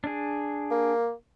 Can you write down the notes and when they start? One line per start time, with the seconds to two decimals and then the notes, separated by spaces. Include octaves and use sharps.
0.04 D4 G#4
0.71 A#3